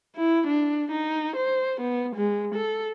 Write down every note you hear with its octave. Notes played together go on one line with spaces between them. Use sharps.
E4
D4
D#4
C5
B3
G#3
A4